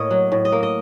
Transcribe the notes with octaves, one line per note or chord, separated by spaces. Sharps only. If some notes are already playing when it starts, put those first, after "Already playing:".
Already playing: A2 A#3 C#5 D#5
F#3
A2
D#5
A#3
D#5